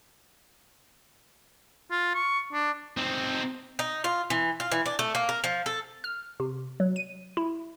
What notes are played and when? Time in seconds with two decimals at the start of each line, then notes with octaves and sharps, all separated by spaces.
1.91 F4
2.15 C#6
2.53 D4
2.97 C4 D#4
3.79 D#4
4.04 F4
4.30 E3
4.60 F4
4.72 E3
4.86 D4
4.99 A3
5.15 A#3
5.29 A#4
5.44 F3
5.66 A4
6.04 F6
6.40 C3
6.80 F#3
6.96 D#7
7.37 E4